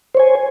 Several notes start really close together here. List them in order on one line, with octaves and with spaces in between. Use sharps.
C5 C#5 G#5